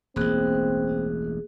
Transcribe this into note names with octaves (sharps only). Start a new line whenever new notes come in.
E1 A1 A#3 C4 G#4 F#6